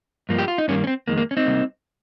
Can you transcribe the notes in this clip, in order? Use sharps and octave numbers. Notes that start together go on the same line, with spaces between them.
G2 F3 A#3
G4
F4
D#4
G2 D#3 G3 A#3 C#4
C#4
C4
F2 D#3 G#3 A#3
A#3
C#4
C4 D#4
C3 G3 A#3